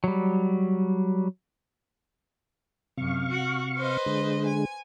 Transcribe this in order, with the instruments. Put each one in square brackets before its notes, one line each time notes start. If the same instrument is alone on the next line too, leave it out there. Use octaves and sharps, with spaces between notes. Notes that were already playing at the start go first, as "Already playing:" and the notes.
[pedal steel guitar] F#3 G3
[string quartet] F#2 [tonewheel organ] C3 F5 C#6
[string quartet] F#4
B4 C5 D#5
[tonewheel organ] D3 G#3
[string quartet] G#5